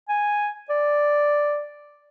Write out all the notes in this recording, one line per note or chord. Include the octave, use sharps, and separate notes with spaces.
G#5
D5